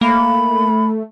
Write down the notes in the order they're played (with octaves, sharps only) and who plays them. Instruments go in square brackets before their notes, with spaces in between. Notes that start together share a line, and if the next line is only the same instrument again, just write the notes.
[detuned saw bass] A3 [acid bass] A#3 [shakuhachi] B5